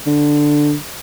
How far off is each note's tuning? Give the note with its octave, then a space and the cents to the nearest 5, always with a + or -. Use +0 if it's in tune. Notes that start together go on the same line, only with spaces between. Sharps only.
D3 +5